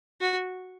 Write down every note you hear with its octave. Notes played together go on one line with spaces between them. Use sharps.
F#4